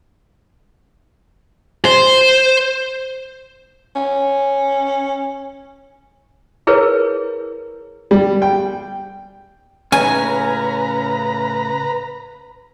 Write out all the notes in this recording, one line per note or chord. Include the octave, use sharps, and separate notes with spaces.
C5
C#4
E4 G#4 A#4 B4 C#5
G3
G5
A2 C#3 C#4 B4 G#5 A#5